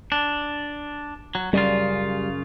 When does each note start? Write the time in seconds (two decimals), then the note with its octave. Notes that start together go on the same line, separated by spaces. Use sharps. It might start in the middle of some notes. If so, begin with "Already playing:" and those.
0.12 D4
1.35 F#3
1.53 F#2 C#3 G3 F4